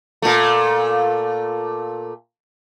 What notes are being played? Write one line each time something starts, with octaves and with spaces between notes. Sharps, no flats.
A#2 A3